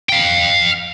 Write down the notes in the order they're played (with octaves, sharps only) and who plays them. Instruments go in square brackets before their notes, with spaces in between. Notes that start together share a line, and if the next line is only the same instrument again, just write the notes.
[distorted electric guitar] F5 G5